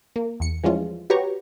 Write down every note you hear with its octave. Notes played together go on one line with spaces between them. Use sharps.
A#3
E2 C#7
E3 F3 G3 G#3 C#4 F4
F#4 G4 B4 C#5 A#5 C#6